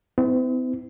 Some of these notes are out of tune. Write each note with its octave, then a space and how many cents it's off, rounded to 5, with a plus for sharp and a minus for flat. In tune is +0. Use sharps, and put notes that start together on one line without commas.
C4 -45 E4 -25